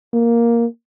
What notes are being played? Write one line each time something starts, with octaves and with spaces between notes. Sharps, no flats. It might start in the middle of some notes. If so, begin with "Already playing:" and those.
A#3